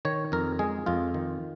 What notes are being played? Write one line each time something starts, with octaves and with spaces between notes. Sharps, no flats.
D#3 C#5
F2 A#4
G#3 G#4
F2 F4
D#3